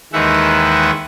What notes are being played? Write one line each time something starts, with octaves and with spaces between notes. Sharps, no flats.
D#2 D#3 E3 G#3 E5 F#5